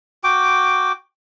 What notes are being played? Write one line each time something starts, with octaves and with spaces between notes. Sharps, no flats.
F#4 G5 D6